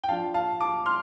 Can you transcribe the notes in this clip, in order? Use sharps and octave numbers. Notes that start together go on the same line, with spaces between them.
G5
F3 D4 F4 F5 A5
F5 A5
A5 D6
C6 F6